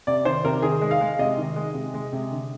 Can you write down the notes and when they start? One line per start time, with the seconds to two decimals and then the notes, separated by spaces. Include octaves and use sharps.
0.07 C3 D5
0.25 D#3 C5
0.45 C3 A#4
0.62 D#3 G#4
0.81 G#3
0.91 F5
1.01 G#3
1.19 C3 D#5
1.38 D#3
1.56 G#3
1.74 C3
1.94 G#3
2.13 C3
2.31 D3